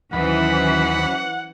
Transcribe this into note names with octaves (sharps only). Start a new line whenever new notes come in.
D#2 E3 F#3 C#4 C5 F#5 B5